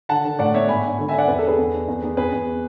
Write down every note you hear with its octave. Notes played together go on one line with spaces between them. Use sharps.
D3 F#5 A5
D3
A2 D5 F#5
B3 C#5 E5
G#2 G#5 B5
D4
D3
E5 G#5
D4 D5 F#5
E2 B4
A4
D4 G#4 B4
E2
D4
E2
B3
E2 G#4 B4
E2